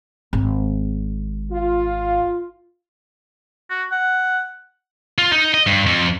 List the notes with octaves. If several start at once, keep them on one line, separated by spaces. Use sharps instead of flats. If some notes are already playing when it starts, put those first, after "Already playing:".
G#1
F4
F#4
F#5
F4
D#4
D#5
G2
F2